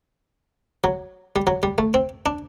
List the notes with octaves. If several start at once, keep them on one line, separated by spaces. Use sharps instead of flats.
F#3
G3
F#3
G3
A3
C4
D4